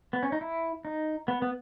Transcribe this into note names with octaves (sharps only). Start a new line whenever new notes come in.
B3
C#4
D#4
E4
D#4
B3
B3